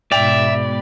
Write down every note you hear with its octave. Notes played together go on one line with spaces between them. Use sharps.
G#2 B2 D5 E5 G5 B5 F7